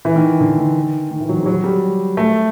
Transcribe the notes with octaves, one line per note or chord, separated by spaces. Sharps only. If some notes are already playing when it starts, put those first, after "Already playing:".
E3
D#3
D3
D#3
D#3
E3
F#3
F3
G3
F#3
G3
A3